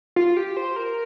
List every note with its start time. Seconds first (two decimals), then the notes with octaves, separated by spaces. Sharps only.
0.16 F4
0.37 G4
0.57 C5
0.76 A#4